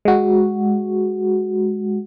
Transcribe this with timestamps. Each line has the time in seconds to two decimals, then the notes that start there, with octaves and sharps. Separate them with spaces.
0.05 G#3 F#4